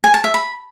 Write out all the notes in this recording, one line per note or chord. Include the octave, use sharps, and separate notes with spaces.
G#5
A5
E5
B5